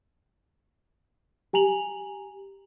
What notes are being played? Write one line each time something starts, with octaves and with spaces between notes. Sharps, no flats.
G4 G#5 A#5 F7 F#7